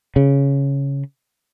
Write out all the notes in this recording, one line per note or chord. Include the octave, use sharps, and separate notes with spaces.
C#3